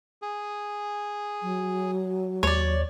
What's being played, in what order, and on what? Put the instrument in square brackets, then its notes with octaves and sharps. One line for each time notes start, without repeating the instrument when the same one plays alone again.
[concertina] G#4
[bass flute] F#3
[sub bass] D#2 [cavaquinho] C#5 D5